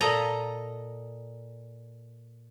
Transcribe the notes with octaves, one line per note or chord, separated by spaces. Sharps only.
A#2 A4 D#5 A#5